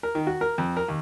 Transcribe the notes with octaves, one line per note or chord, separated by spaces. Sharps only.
A#4
D#3
F#4
A#4
F2
A#4
D#2